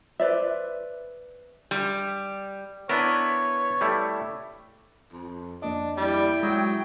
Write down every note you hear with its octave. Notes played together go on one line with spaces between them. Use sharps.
B4 C5 D5 E5
G3
B3 D4 E4 A#4 C#5
G3 A3 E4
F2
F2 A#3 D4 D#5
G3 E4 G5
F#3 G#3 F#4 D#6